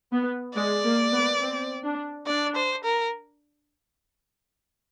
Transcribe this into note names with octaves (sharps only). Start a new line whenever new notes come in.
B3
G#3 D5
A#3
B3
C4
D4
D4 D5
C5
A#4